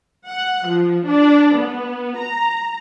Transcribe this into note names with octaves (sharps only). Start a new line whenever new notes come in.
F#5
F3
D4
B3
A#5